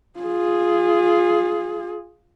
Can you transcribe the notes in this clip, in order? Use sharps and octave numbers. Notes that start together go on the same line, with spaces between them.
F4 G#4